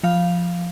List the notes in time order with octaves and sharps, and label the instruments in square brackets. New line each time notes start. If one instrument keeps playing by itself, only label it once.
[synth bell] F3 F5